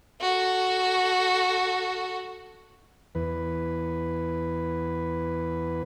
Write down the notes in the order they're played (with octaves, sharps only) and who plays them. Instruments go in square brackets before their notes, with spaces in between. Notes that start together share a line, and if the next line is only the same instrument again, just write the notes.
[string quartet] F#4 A4
[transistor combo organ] E2 B4